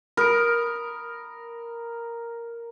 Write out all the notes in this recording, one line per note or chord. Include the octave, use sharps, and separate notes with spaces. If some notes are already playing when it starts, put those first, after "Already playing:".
A#4 B5 D#6 D7